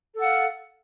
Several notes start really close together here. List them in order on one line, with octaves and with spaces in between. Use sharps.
A4 F#5 F5